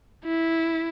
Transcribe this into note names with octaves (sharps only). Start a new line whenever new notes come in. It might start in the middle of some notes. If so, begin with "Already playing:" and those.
E4